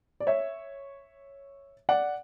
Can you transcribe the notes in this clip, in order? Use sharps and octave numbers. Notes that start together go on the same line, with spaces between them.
D5
C#5 E5
D5 F#5